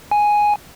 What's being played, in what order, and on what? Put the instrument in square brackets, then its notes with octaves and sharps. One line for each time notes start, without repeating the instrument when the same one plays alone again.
[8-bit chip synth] G#5